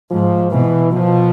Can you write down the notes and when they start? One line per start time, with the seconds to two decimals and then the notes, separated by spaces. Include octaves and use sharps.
0.11 G#2 F3
0.51 B2 E3
0.92 B2 F3